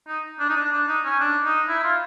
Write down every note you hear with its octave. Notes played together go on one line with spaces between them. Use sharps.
D#4
D4
D#4
D4
D4
D#4
C#4
D4
D#4
E4
F4